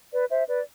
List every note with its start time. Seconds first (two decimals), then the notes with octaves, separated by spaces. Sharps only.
0.11 B4 D5
0.30 C5 E5
0.48 B4 D5